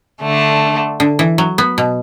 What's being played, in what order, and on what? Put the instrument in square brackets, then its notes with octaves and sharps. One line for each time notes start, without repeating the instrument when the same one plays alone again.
[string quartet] D3 A3 D4
[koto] D3
E3
F#3
B3
B2